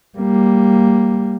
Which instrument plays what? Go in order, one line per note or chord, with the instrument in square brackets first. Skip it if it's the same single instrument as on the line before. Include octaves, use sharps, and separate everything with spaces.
[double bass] G3 A#3